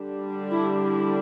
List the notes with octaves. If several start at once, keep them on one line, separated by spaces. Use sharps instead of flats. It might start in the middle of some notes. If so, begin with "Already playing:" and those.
Already playing: D3 G3 D4
E4
E4